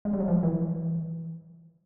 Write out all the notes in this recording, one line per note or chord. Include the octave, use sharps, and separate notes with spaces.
G#3
G3
F#3
F3
E3